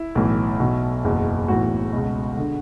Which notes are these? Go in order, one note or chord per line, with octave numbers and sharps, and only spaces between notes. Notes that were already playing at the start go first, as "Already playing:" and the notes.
Already playing: E4
B1 A2 E3
B1 B2
F#1 E2 B2
B1 A2 E3 F#4
C#2 B2
D3